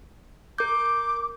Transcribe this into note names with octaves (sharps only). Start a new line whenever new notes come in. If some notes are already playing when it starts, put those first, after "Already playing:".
A#4 D6 G6